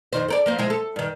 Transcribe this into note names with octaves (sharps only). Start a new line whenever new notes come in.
F2 D#3 C5
A4 A#4 D5
F3 A#3 C5
F3 G#3 E4
A4
G2 D#3